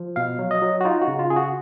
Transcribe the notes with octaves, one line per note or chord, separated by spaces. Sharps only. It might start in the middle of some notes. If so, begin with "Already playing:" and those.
Already playing: F3
B2 F5
F#3
D#5
F#3
F#4
D#4 F4
F#4
C#3
F4
C#3 G#4
F#4